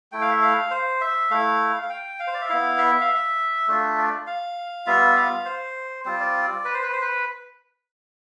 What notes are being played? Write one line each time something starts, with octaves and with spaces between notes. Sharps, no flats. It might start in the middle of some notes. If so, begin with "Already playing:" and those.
A3 E4 G5
F5
E5
F5
C5
E5
A3 E4 F5
F5
G5
F5
C5
D5
E5
B3 E4 F5
E5
F5
E5
A3 D4 F4
D5
F5
G3 B3 F4 E5
F5
C5
G3 C4 F4 C5
D5
B4
C5
B4
C5
B4